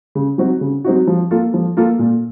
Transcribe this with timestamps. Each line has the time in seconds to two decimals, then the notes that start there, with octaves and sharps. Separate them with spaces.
0.15 C#3
0.38 F#3 C4 D#4 F#4
0.61 C#3
0.85 F#3 C4 D#4 F#4
1.07 F3
1.31 A#3 F4 A4
1.54 F3
1.77 A#3 F4 A4
1.99 A#2